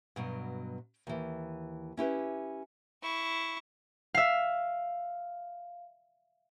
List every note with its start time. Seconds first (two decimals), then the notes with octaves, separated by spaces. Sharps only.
0.16 G2 B2 F#3
1.07 D#2 E3
1.97 C#4 E4 G4 B4
3.02 E4 C#6
4.14 E5 F5